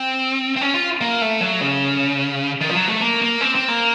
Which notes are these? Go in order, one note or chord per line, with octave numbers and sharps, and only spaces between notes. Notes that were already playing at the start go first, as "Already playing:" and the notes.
Already playing: C4
C4
C#4
F4
A#3
A3
F#3
C#3
D#3
F3
F#3
A3
A#3
A#3
C4
C4
A#3